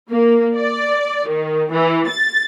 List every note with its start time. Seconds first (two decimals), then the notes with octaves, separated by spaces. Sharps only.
0.11 A#3
0.57 D5
1.29 D#3
1.72 E3
2.08 A6